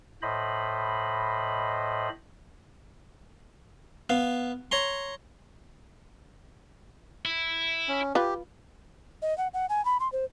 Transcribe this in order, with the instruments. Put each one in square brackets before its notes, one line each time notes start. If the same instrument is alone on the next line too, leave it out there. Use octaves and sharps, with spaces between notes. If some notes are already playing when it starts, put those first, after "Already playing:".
[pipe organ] A2 C5 D#5 B5
[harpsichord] B3 F5
C#5 A#5 C6
[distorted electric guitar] E4
[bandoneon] C#4
[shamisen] F4 B4 [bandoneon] G4
[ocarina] D#5
F#5
F#5
G#5
B5
C6
C5